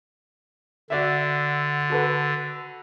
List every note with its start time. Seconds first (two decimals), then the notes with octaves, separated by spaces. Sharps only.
0.90 D3 F#4 D5 E5
1.90 F#4 A4 B4